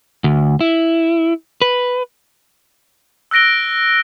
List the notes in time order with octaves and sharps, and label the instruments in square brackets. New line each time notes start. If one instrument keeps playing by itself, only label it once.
[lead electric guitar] D2
E4
B4
[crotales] E6 F#6 A#6 D7 G7